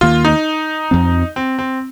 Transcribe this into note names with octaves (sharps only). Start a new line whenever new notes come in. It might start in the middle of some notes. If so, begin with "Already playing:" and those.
D#2 D#3 A#3 F4
D#4
F2 F3 C4
C4
C4